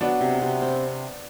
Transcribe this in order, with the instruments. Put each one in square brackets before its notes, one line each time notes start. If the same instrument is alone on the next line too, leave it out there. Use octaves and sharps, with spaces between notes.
[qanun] F#3 [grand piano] B3 D4
[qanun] C3
C3
C4